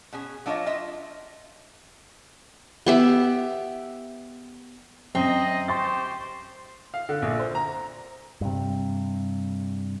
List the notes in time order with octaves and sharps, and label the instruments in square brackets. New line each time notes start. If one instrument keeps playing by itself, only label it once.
[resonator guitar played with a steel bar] B2 C#4 G#4
F#3 D4 F4 A4 C#5 D#5
F4 D#5 E5
[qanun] B3 G4 E5
[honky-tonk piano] F#2 [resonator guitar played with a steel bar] C4 [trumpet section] D#5
[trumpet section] G4 C5 [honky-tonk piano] C6 C#6 A6
[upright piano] F5
D3
A#1
C5
A#5
[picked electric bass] G2 C3